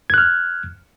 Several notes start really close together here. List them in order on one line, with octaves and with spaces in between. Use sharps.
G#6 F#6 F6